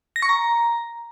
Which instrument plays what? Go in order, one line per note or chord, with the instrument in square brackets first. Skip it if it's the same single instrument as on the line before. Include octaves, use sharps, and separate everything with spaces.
[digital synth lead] A#6
C#6
A#5